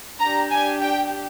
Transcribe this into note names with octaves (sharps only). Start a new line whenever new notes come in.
D4 G4 A#5
G#5
G5